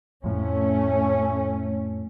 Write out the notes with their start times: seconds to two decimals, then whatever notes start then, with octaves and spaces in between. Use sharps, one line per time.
0.24 F2 A2 A3 C#4